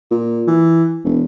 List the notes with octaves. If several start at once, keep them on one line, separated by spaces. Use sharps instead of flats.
A#2
E3
E1